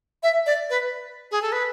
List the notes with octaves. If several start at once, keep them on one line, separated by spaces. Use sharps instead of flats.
E5
D5
B4
G#4
A4
B4